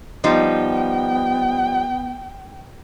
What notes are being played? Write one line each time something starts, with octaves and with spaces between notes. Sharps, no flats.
F3 G3 B3 D#4 G5